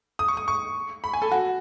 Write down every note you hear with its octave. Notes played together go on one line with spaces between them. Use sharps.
D#6
C#6
D#6
C#6
B5
G#5
A4
F#4